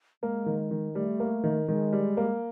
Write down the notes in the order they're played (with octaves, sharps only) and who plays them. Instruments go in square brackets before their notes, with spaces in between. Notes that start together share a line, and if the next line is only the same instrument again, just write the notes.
[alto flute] G#3 [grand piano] A#3
[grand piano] D#3
D#3
[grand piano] G3 [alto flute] A3
[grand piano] A#3
D#3
[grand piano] D#3 [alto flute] G#3
[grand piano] G3
A#3